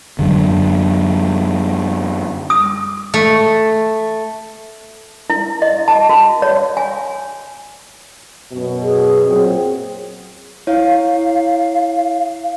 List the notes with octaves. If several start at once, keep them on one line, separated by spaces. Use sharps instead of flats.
F#2 D3
D#6
A3
E4
D#5
A5
F#4
C#5
G#5
F#2 B2
G#4
A#2 F#3 C4
E4 C#5 F5